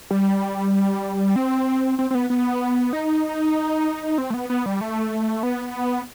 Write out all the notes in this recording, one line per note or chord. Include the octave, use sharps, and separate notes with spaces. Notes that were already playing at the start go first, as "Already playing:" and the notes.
G3
C4
C4
C4
B3
B3
D#4
C4
A3
B3
B3
G3
A3
B3